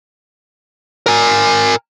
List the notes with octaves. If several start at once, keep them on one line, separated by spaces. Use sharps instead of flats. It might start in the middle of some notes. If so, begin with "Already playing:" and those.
A#4 G#5